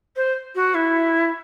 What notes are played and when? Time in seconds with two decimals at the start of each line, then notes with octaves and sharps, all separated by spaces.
0.16 C5
0.55 F#4
0.74 E4